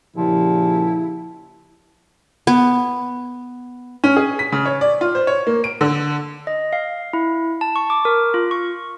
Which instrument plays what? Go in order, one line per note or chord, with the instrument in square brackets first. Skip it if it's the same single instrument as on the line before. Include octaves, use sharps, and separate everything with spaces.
[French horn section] A#2 C#3 G4 [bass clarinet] F3 [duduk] E4
[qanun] B3
[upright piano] C#4
G#4
B6
C#3
C#5
D5
F4
C5
C#5
A#3
D7
D3
[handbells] D#5
F5
E4
A5
C#6
D6
A#4
F4
C#6